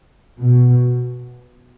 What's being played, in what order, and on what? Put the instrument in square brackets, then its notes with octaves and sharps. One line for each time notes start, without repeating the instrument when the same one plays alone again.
[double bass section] B2